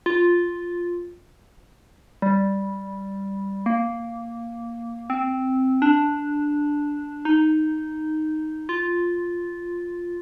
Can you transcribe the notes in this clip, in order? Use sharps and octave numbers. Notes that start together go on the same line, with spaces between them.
F4
G3
A#3
C4
D4
D#4
F4